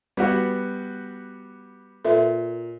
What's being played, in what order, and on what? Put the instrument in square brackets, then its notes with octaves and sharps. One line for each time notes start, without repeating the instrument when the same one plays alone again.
[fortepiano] G3 B3 F#4 [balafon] B4
[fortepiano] A#2 [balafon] A4 B4 E5